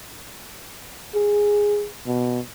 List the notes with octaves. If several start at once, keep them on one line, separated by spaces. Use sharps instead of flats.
G#4
B2